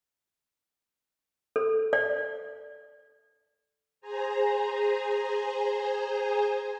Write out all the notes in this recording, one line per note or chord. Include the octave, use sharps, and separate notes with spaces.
A4
D5
G#4 C5 G#5 A#5